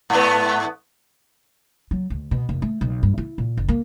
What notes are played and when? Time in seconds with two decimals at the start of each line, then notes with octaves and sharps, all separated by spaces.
0.10 G#2 A3 B3
1.91 F#3
2.10 D2
2.31 B2
2.49 F1
2.62 A3
2.81 B1
3.03 G2
3.18 E4
3.38 A#2
3.57 F#1
3.68 A#3